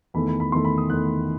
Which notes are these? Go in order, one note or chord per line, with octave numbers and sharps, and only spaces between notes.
E2 D#3 A3 B5
B5
B5
E2 D#3 A3 C6
B5
D#6
E2 D#3 A3 F#6